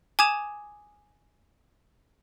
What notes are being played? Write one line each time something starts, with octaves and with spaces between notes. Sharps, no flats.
G#5 D6 D#6 G#6 E7 F7